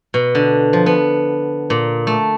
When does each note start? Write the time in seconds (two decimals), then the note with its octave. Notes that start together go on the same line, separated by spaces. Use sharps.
0.14 B2
0.35 D3
0.73 F3
0.86 B3
1.70 A#2
2.07 A3